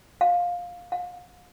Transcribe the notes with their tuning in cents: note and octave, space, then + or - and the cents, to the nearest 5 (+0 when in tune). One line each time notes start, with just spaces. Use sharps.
F5 +15
F5 +35